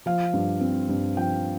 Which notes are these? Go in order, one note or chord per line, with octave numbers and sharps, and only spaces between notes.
F3 F5
G2
C4
G2
F3 G5